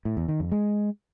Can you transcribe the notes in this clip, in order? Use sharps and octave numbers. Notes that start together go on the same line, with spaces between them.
A2
E2
D#3
F2
G#3